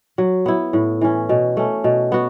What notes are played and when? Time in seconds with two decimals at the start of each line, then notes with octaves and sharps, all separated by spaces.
0.18 F#3
0.46 B3 E4
0.73 A2
1.01 E3 C#4
1.29 B2
1.57 A3 C#4
1.84 B2
2.12 B3 F#4